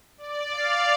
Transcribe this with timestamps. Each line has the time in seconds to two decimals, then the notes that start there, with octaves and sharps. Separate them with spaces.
0.18 D5
0.51 F5